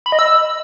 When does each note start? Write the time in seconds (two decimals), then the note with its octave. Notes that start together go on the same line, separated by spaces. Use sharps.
0.06 B5
0.12 D#5
0.19 E6